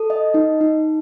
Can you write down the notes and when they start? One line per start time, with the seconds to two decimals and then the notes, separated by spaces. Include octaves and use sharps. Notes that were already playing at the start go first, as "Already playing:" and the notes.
Already playing: A4
0.10 D#5
0.34 D#4
0.61 D#4